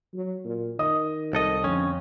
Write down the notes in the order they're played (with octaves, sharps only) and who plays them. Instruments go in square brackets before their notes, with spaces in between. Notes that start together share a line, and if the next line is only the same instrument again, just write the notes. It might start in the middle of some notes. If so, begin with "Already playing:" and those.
[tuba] F#3
A#2
[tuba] D#3 [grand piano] D#5 D#6
[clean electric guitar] C2 A4 D#5
[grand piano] F2 [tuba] D3 [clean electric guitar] C#4